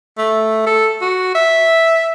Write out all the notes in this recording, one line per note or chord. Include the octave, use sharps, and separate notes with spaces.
A3
A4
F#4
E5